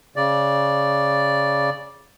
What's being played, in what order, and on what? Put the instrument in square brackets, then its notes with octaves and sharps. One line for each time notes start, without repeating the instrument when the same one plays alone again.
[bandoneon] C#3 D5